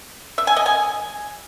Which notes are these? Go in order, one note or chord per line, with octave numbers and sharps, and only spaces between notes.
E5
G#5
D#5
G#5